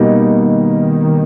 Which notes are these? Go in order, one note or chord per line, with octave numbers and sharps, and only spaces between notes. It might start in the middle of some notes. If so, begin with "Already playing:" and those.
Already playing: B2 G3 A#3 D#4
D#3